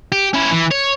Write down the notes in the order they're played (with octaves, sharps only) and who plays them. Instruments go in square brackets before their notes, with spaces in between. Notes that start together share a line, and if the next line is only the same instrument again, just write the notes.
[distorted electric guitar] G4
C#4 E4
E3
C#5